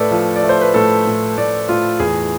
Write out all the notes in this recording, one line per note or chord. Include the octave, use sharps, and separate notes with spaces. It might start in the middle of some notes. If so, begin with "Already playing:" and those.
Already playing: A2 A3 A4 B4 D5
F3
D5
A3
C5
B4
A2 A4
A2
A2 D5
A2 F4
E2 G#4